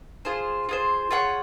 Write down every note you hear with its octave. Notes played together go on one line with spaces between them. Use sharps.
F4 G#4 C5
F4 G#4 C5
F4 G#4 C#5 F#5